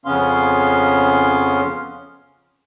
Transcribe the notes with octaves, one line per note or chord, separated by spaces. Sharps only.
F2 C#3 B3 C#4 F5 C6